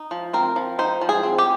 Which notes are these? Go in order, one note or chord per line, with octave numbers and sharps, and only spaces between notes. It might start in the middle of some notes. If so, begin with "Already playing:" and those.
Already playing: D#4
F3
C4 A#4
F3
D#4 C5
F3
G#4
C4
G4